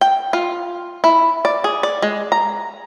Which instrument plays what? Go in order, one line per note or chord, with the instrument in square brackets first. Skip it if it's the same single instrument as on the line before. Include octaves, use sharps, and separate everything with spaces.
[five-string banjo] G5
F4
E4
D5
G#4
D5
G#3
A#5